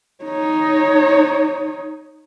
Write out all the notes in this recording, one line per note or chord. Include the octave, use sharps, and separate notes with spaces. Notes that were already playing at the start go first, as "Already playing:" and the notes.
D#4 C#5